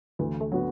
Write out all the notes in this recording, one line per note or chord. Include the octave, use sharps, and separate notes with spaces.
D2 E3
A3
D3 F#3 B3 F#4